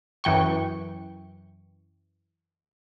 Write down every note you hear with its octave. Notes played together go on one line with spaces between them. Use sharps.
F#2 E3 G5 C#6